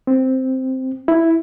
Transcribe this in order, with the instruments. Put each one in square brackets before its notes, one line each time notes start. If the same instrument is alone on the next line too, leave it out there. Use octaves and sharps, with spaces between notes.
[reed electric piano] C4
E4